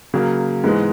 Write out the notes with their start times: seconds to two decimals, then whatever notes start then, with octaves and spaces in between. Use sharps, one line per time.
0.14 C#3 F#3 A#3
0.64 G#2 E3 G#3 B3